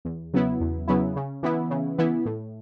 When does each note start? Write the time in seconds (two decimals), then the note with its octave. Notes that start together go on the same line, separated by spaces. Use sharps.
0.05 E2
0.33 C#3 F#3 B3 E4
0.61 E2
0.88 C#3 F#3 B3 E4
1.16 C#3
1.43 E3 B3 E4
1.70 C#3
1.98 E3 B3 E4
2.25 A2